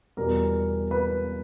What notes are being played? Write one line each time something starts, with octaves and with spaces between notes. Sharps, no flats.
E2 B2 G3 A#4
B4